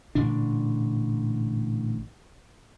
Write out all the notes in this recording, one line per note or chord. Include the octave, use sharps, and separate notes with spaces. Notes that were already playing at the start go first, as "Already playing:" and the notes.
A1 A#2 D3 D4